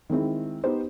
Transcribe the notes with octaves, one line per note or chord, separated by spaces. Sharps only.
D#3 G#3 C4 E4
B3 D#4 G4 C5